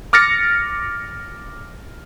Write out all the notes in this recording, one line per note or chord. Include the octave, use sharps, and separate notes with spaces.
D6 F6 A6 A#6 C#7